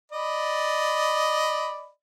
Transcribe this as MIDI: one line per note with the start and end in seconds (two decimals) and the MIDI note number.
0.12 1.89 74
0.12 1.89 75
0.12 1.89 83